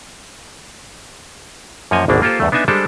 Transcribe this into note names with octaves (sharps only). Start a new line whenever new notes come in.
F#2 F3 A#3 C#5 D#5 G#5
G#1 D2 B2 A#3 D4
A#3 F4 G4 A4 C5
E2 G2 A3
B3 D4 D#4 E5 G#5
G3 G#3 D4 G4 A4 C5